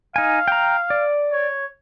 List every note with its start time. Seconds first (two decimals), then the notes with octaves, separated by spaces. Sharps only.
0.16 D#4 F5 G#5
0.48 G5 A#5
0.90 D5
1.32 C#5